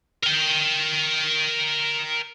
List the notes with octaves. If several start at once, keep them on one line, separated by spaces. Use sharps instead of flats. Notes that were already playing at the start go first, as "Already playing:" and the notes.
A#4 G5